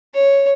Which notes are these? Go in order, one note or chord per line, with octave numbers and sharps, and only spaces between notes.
C#5